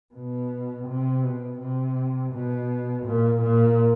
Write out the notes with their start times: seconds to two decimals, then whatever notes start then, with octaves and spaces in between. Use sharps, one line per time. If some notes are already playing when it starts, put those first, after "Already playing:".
0.14 B2
0.87 C3
1.23 B2
1.60 C3
2.32 B2
3.05 A#2
3.42 A#2